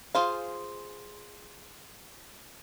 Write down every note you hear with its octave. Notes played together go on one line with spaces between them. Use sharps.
F4 G#4 C5 F5